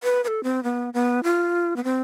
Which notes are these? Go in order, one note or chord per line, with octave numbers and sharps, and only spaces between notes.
B4
B4
A4
C4
B3
B3
F4
B3
C4